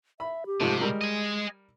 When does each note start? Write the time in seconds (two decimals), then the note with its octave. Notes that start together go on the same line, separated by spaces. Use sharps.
0.20 E5 B5
0.46 G4
0.60 G#2 C3 F3 A3
0.81 G3 G#3 A#4
1.01 D#5 G#5